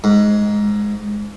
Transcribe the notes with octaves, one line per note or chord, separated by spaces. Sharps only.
G#2